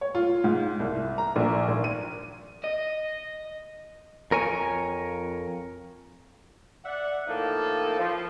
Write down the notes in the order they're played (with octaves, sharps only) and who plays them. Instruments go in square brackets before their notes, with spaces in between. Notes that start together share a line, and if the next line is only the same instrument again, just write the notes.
[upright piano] C#5
F4
G#2
C2
A#5
A#1
G#1
D#7
[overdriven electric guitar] D#5
[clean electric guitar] F2 A#4 C#5 G#5
[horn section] D5 E5 F#5
A2 F3 A#3 D#4 A4
F3